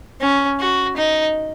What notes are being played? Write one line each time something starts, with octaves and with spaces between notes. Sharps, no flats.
C#4
F#4
D#4